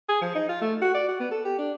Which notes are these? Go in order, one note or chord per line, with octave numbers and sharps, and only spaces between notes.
G#4
F3
D#4
F4
A3
F#4
D5
F#4
B3
A4
G4
D4